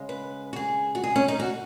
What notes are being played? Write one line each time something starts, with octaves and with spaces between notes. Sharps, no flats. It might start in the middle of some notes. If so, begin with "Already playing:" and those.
Already playing: C#3 G#3
B4
F#4
G#4
F#4
G#4
C#4
D#4
F#4